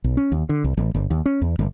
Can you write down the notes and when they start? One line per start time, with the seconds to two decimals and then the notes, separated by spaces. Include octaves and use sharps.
0.04 B1
0.17 C#4
0.32 D#2
0.49 D3
0.64 C2
0.77 A1
0.94 G1
1.10 D#2
1.26 C#4
1.41 E2
1.59 G1